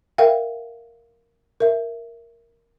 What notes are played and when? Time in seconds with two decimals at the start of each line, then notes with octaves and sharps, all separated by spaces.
0.18 A#4 E5 F5 G5
1.60 A#4 E5